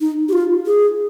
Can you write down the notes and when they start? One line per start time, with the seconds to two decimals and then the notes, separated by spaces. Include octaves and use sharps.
0.01 D#4
0.29 G4
0.33 F4
0.66 G#4